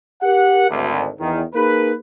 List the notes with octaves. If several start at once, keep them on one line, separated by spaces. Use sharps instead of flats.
G4 A#4 F#5
G#1 D2
E2 D#3
A#3 D#4 G#4 A#4 B4